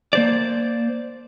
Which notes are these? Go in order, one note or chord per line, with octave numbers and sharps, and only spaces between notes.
A#3 C5 D5